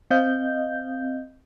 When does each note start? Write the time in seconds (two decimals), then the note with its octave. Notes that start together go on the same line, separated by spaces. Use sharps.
0.11 C4 D#5 F5 G6